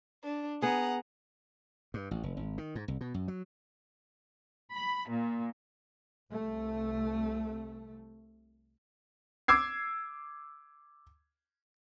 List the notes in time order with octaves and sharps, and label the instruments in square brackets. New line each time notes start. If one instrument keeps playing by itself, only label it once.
[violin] D4
[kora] B3 G#4 [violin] F#5 A#5
[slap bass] G2
A1
F1
G#1
D#3
G#2
C2
B2
F#2
F#3
[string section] B5
A#2
[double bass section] C2 A3
[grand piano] D6 E6 G#6 C7